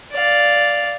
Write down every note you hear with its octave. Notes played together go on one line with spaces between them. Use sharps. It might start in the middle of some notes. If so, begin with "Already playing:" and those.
D5 F5